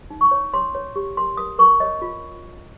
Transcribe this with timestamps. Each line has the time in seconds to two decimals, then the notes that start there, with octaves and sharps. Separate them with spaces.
0.10 D#4
0.21 C#6
0.31 C#5
0.54 C#5 C6
0.75 C#5
0.96 G4
1.17 A#4 C6
1.37 A#4 D#6
1.59 A#4 C#6
1.80 C#5 D#5
2.02 F4